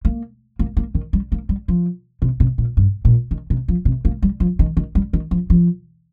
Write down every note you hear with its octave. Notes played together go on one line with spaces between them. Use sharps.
A#3
A#3
A#3
D#3
G3
A#3
G3
F3
C3
C3
A#2
G2
A#2
D#3
C3
F3
C3
A#3
G3
F3
D#3
D#3
G3
D#3
F3
F3